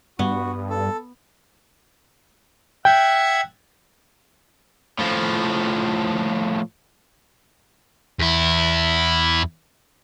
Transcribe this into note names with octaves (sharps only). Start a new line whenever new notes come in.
G2 B3 F#4
A4
E5 F#5 G5 G#6
A2 F3
E2 E4